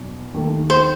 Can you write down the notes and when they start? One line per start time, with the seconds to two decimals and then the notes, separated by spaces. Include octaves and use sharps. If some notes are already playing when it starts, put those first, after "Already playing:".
Already playing: E2 B2 F#3
0.34 D#2 D#3 A3
0.70 C5